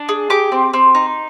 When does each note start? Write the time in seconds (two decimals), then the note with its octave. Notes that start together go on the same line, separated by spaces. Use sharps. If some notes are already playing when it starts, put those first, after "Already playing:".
Already playing: D4
0.09 G#4
0.30 G4 D6
0.52 C4
0.74 C4
0.95 D#4